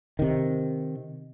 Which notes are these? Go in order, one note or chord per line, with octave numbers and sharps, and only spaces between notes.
C3 D#3